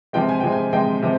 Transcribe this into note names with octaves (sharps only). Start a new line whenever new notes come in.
C3 F3 G#3 G5
G#5
C3 F3 G#3 G5
G#5
C3 F3 G#3 G5
C3 F3